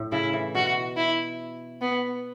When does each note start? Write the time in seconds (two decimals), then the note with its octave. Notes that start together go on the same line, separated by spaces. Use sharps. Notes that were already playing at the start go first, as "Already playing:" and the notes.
Already playing: A2
0.12 C#3 E4
0.33 E3
0.55 B2 F#4
0.97 E4
1.81 B3